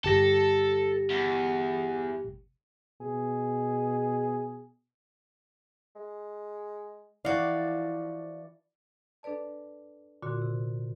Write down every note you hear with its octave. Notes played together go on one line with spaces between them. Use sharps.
G1 G4 A4 A#6
E2
B2 G#4
G#3
E3 F3 F#4 D5 F5
D4 A4 B4 D5 A5
A#2 D3 F4 F#4 C6
C3